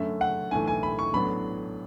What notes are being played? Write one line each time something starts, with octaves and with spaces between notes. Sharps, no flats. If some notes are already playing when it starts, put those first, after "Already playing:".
Already playing: F#2 D3 A3 E5
F#5
B1 A2 E3 A3 D4 G#5
G#5
B5
C#6
A1 A2 F#3 B3 D4 B5